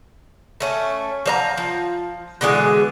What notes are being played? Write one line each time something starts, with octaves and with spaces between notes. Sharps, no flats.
A3 C#4
F3 C#5 A#5
F3
B2 D3 E3 G#3